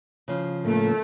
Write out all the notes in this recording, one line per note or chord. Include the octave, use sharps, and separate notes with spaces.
C#3 F3
A2 A3 A#3